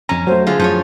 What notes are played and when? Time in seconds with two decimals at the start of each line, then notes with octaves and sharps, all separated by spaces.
0.09 F2 C#4 A#5
0.27 F#3 A3 C5
0.47 D3 F4 G#4
0.59 F#2 F3 F4 C#5 G6